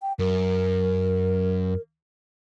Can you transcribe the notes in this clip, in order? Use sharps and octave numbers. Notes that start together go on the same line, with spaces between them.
G5
F#2 A#4